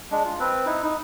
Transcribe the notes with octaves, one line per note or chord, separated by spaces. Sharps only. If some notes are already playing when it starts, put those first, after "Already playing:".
G#3 D4
F4
C4 B4
D#4 E4
D#4